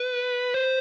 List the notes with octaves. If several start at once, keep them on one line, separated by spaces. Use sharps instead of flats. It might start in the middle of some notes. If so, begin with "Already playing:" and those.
Already playing: B4
C5